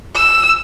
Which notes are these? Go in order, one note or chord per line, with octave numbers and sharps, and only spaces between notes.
E6